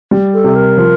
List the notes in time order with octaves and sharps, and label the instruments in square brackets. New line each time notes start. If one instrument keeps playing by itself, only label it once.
[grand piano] G3
[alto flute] A4
[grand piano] C3
[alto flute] A#4
[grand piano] F3